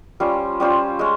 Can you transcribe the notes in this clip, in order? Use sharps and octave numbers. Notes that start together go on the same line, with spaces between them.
G3 C#4 F4 C5
G3 C#4 F4 C5
G#3 C#4